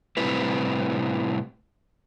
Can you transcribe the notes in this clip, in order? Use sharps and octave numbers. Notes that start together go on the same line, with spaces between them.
A2 C3 G3 C4 E4 B4